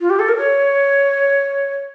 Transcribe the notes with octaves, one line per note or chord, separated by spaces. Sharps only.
F4
G4
A4
A#4
C#5